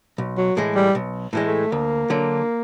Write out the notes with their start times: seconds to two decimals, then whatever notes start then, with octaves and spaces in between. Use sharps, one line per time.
0.18 B1
0.37 F#3
0.57 A2 E3 G#3
0.75 G3
0.95 B1
1.33 A2 E3 G#3
1.46 A3
1.72 D2 A#3
2.10 D3 F#3